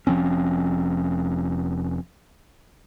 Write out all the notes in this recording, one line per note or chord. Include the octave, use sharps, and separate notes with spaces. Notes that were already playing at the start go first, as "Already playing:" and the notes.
F1 F3 C4 C#4